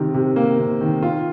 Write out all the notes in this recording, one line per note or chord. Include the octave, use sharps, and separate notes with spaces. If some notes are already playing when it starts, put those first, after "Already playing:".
Already playing: C3 D#3
C3
A#3
C3
D#3
F4